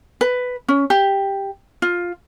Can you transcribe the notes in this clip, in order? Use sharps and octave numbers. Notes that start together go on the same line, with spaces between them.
B4
C#4
G4
F4